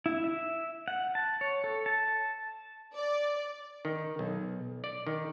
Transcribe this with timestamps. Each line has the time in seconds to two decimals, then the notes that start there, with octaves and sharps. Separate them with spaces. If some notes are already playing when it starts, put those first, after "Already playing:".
0.06 E4
0.24 E5
0.88 F#5
1.15 A5
1.41 C#5
1.64 A4
1.86 A5
2.96 D5
3.85 D#3
4.19 B1
4.84 D5
5.07 D#3